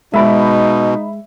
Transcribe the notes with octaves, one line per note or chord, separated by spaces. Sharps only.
B2 G#3 D#4 D5 E5 B5